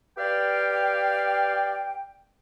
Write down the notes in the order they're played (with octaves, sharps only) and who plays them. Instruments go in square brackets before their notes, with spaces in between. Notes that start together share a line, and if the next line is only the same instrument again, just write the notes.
[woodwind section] G4 B4 D5 F5 G5